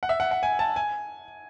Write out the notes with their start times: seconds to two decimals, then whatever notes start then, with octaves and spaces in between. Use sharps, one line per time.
0.03 F#5
0.09 E5
0.20 F#5
0.31 F#5
0.43 G#5
0.59 A5
0.76 G#5